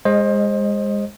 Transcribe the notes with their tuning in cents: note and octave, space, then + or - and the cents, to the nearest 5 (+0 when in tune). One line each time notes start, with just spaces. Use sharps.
G#3 -25 C5 +25 D#5 +0